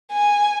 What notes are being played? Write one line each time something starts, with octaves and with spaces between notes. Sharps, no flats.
G#5